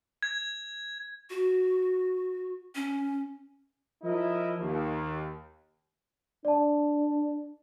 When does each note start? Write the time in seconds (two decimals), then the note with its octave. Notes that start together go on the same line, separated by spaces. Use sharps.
0.23 G#6
1.30 F#4
2.75 C#4
4.03 F3 E4 A#4 D#5
4.58 D#2
6.45 D4 D5 A5